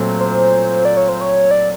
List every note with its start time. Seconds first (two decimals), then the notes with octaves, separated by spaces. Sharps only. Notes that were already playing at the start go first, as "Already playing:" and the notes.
Already playing: A#2 F#3 A3 C4
0.20 C5
0.85 D5
0.97 C#5
1.09 C5
1.21 C#5
1.51 D5